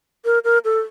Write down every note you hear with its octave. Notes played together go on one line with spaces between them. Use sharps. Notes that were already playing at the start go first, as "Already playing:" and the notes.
A#4
A#4
A4